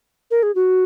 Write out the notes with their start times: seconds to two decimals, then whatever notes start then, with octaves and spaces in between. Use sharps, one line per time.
0.31 A#4
0.43 G#4
0.55 F#4